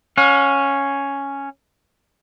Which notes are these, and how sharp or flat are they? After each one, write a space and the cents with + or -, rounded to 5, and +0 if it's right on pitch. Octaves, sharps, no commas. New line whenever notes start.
C#4 +0 F5 +45